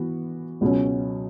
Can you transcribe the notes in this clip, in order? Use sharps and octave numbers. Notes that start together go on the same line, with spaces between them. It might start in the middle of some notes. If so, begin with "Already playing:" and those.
Already playing: E3 B3 F#4
C#2 B2 F#3 C#4